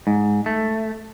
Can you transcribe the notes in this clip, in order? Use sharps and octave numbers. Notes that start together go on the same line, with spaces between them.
G#2
A3